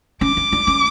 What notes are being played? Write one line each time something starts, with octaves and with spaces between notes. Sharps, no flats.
C#4 D6
C#4
D4
C#4